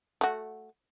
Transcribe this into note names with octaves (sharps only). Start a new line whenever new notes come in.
A3 F#4